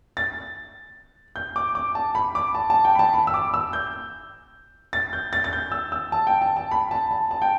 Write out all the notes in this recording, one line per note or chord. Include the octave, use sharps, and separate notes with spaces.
A6
G6
D6
D6
A5
B5
D6
A5
A5
G5
B5
A5
B5
E6
D6
E6
G6
A6
G6
A6
A6
G6
E6
E6
A5
G5
A5
A5
B5
A5
A5
A5
G5